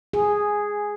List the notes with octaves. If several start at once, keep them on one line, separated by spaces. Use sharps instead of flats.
G#4